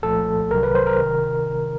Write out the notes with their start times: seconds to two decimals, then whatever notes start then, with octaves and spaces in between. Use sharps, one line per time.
0.02 C2 A#2 F3 A3 A4
0.51 C2 C3 D#3 F#3 A#4
0.63 B4
0.75 C5
0.87 A#4
0.99 C3 D#3